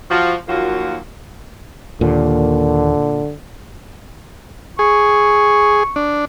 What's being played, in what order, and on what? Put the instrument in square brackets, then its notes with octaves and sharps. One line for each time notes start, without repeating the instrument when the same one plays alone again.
[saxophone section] F3 F#4
D#2 F3 F#3 A#3 F4 F#4
[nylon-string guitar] D#2 [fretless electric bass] A#2 [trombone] D3
[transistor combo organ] G#4 [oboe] C#6
[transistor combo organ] D4